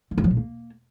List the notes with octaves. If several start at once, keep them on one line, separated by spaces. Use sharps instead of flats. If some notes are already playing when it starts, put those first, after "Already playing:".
F3
F2
F3
A#2
A#3